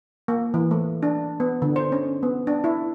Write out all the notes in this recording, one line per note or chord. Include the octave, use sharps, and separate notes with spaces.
A#3
E3
A3
D4
B3
D3
C5
C#4
B3
D4
E4